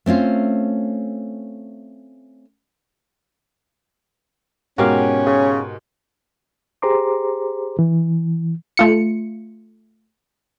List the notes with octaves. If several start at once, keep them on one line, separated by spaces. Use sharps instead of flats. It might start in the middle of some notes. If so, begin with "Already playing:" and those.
A3 C4 C#4 F4
G#2 B2 C#4 F#4 G4 A#4 F5
C#3
G4 G#4 C5 A#5 C6 D6
E3
A3 F4 C#7